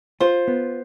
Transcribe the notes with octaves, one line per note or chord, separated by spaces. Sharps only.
F4 C5
B3